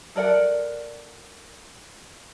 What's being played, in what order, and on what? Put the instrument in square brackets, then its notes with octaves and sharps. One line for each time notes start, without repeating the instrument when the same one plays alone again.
[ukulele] A4 A#4 D5 F#5